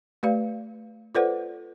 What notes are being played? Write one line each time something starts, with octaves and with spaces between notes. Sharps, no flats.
A3 G4 B4 D5 F5
F4 A4 B4 C5 D5 F#5